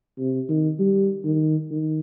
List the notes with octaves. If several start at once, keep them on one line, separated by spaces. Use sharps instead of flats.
C3
D#3
G3
D#3
D#3